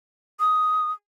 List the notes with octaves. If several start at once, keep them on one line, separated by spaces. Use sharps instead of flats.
D#6